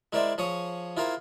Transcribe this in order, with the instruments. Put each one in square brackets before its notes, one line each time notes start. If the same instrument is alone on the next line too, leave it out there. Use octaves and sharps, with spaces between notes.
[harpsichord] G#3 E4 A#4 C5 D5 E5
F3 G#4 C#5 D#6
E4 F4 G#4 A#4 C5